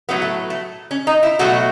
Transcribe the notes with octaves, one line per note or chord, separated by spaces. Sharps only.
A2 F#3 A3 B3
A3
A3
C#4
D#4
E4
B2 F#3 A3 F#4